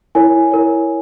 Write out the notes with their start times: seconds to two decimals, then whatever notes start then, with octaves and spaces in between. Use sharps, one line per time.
0.15 E4 A#4 C#5 G#5
0.52 E4 A#4 C#5